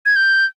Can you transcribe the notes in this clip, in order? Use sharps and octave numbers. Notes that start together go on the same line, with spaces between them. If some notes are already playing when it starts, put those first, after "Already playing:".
G#6
G6